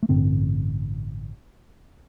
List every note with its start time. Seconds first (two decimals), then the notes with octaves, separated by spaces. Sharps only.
0.03 A3
0.09 A1 G2 D3 C4